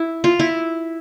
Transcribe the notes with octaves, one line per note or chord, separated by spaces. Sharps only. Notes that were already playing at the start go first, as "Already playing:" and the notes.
Already playing: E4
F4
E4